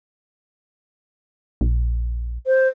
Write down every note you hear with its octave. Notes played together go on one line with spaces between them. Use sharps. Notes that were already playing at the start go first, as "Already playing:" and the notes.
A#1
C5